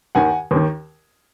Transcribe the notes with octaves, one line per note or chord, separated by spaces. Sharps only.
D#2 D#3 F#5 G#5
D#2 D#3